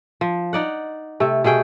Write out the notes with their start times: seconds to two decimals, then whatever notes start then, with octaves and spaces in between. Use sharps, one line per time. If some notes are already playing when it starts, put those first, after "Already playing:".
0.21 F3
0.53 D#4 D5 F#5
1.20 C3 A3
1.44 B2 A3 G#4 G5